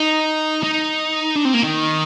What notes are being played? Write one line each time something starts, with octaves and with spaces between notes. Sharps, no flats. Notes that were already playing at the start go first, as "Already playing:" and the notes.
Already playing: D#4
D#4
D4
C4
A#3
D#3